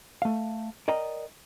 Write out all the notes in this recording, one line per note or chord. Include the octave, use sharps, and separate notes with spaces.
A3 F5
A#4 D5 D#5 G5 A#5